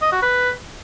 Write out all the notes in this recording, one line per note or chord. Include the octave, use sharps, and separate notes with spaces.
D#5
F#4
B4